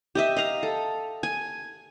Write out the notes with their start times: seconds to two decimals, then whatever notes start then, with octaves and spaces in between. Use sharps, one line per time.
0.15 G4 D#5 E5
0.36 D#5 F5 A#5
0.63 A4
1.23 G#5